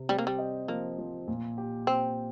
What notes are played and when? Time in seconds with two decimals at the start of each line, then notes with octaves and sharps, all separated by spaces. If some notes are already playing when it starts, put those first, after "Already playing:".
Already playing: C3
0.09 G3 C4
0.19 A#3
0.27 G3
0.39 D#5
0.68 F3 A#3
0.98 F3
1.28 A#2
1.58 G4
1.87 C4 G4